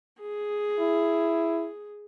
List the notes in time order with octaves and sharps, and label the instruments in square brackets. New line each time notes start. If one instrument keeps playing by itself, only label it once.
[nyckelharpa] G#4
[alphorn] E4